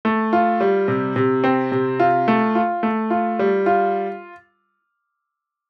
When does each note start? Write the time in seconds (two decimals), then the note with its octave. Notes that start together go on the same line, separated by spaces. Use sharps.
0.05 A3
0.33 F4
0.61 G3
0.88 C3
1.16 C3
1.44 C4
1.72 C3
2.00 F4
2.28 A3
2.55 F4
2.83 A3
3.10 F4
3.39 G3
3.66 F4